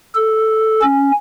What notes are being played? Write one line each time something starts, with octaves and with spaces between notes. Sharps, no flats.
A4
C#4